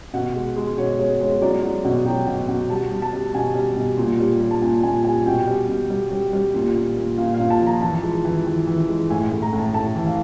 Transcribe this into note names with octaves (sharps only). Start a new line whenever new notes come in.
B2 F#5
G#3
G#3
B2 C#5
G#3 C#5
G#3 C#5
F#3 D5
F#3
B2
F#3 G5
B2
B2
G3 A5
G3
A5
G3
B2 G#5
G3
B2
A#2
G3
G3
A5
A#2 G#5
A#2 G#5
G3 G#5
B2 G5
G3
B2
G3
G3
G3
A#2
A#2
A#2
A#2 F5
F5
A#2
A5
F3
A#5
E3 A5
G#3
E3
E3
E3
G#3
A2 G#5
A2
A#5
A2
A5
A2 A5
E3
F5